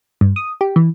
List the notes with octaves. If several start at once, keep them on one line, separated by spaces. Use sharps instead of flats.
G2
D#6
G4
E3